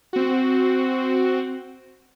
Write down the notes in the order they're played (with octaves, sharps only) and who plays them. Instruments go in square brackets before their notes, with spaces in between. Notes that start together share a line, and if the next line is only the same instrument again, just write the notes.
[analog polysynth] C4 F#4